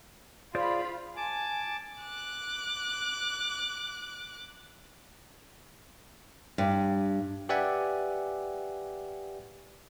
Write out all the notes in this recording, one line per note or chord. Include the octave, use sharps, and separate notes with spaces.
F4 G#4 C5 D5 B5
G#5 A5 D6
D6 F#6
G2
G4 B4 D5 E5 F#5 G#5